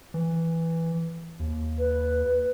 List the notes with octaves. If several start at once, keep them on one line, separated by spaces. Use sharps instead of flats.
E3
D#2
B4